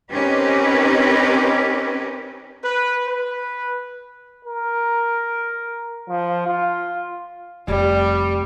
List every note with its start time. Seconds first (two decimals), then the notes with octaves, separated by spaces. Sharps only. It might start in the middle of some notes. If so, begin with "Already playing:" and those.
0.12 C4 C#4 D#4 G4 A#4 B4
2.62 B4
3.07 B4
4.45 A#4
6.09 F3
6.47 F4
7.68 F1 G3